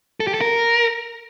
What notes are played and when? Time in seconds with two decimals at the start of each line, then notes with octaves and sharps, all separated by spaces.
0.20 A4
0.27 G4
0.34 A4
0.41 A#4